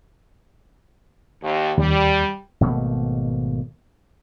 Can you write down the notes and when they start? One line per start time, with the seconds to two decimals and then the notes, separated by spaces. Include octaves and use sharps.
1.42 D#2
1.78 D#2 G3
2.61 G#1 B2 A3 A#3